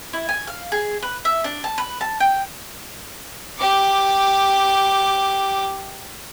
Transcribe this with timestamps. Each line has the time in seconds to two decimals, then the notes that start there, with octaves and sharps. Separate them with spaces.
0.13 E4
0.29 G#5
0.47 F5
0.72 G#4
1.03 B4
1.25 E5
1.44 D4
1.64 A5
1.78 B4
2.01 A5
2.20 G5
3.59 G4 D6